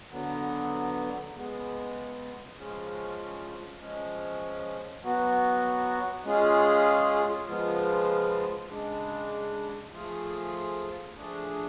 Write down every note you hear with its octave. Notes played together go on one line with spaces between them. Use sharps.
D3 F#3 B3
C#3 G#3 B3
C#3 F3 G#3 C#4 F4
F3 G#3 C#4
F#3 B3 F#4
G#3 C#4 F4 G#4
C#3 F3 G#3 B3 F4
C#3 G#3 D4
F3 A3 F4 G#4
F3 A3 D4 G#4